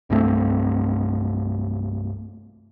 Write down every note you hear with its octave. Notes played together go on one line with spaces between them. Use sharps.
C2 G2 A3 C4